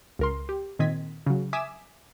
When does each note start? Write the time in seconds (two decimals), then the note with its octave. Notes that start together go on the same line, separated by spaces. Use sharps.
0.19 C#2 A#4 C6
0.49 G4
0.79 A#2 D#3 C4 D#5 G#6 B6
1.27 C#3 F#3
1.53 E5 G#5 D6 D#6 B6 E7